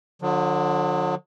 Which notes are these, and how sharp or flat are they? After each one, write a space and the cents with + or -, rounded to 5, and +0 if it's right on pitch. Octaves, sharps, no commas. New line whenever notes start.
D3 +20 F#3 -45